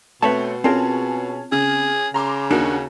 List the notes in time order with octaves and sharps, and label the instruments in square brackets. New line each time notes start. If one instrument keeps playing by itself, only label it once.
[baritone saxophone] B2 [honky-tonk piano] A3 C4 [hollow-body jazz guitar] B4 C#5 A5
[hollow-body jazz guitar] C4 F4 A#4 [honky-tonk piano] C#4 G#4 A5
[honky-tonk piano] C#3 [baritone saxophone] G#4
[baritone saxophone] C#3 [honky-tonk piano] A#5 C6 D6
[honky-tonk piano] D#2 F#4 [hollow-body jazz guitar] D4 D#4 A#4